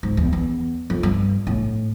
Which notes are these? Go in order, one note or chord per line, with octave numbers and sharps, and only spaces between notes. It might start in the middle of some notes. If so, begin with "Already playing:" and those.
G#2
E2
E2
F2
G2
A2